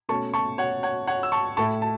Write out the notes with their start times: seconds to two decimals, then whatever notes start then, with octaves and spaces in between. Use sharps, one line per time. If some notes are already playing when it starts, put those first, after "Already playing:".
0.09 B2 A3 C#4 A5 C#6
0.34 A5 C#6
0.58 C#5 F#5
0.83 C#5 F#5
1.07 C#5 F#5
1.23 E6
1.32 A5 C#6
1.57 A2 A3 E4 A5 C#6
1.82 A5